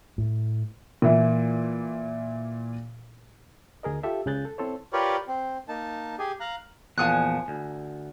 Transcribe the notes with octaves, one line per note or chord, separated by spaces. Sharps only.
A2
A#2 E3
D2 G#4 A#4 D#5
F4 G4 A4 E5
C#2 C#3 G#4 F#6 G6 A6
A4
C4 E4 A4 C5 C#5
F4 G4 A#4 B4 C#5 D5
C4
A#3 D#4 A5
G4 G#4 G#5
F5 A#5 F#6
E2 A#2 F3 G#5 D#6 F#6
D2